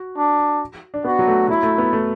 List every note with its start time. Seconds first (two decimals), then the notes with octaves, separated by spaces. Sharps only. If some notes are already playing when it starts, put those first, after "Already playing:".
Already playing: F#4
0.17 D4
0.94 D4
1.04 B3 F#4
1.19 F#3
1.27 A3
1.48 F#3 E4
1.63 A3
1.78 B3
1.93 A3